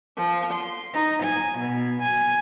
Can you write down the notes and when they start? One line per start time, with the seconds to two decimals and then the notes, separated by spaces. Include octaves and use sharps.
0.17 F3
0.53 C6
0.93 D#4
1.23 G#5
1.59 B2
2.03 G#5